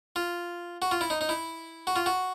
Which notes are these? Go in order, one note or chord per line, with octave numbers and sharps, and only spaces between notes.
F4
F#4
F4
E4
D#4
D#4
E4
F#4
F4
F#4